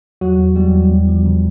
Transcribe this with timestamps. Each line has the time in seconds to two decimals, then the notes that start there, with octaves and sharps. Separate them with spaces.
0.21 E2 F#3 F#4
0.39 E2
0.56 E2 G3 G4
0.74 E2
0.91 E2
1.08 F3
1.26 C#3